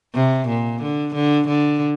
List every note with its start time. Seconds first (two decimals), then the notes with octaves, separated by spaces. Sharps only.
0.15 C3
0.48 A#2
0.82 D3
1.15 D3
1.48 D3